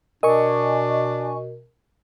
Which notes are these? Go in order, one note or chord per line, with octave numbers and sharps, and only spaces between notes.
B2 D4 A#4 D#5 G#5 C#6